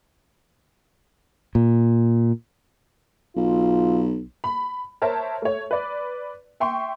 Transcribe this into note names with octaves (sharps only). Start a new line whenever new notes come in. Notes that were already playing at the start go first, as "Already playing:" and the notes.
A#2
B1 F4
B5
A#4 C5 C#5 E5 A5
A3 C#5
B4 D5
E5 G5 C6 C#6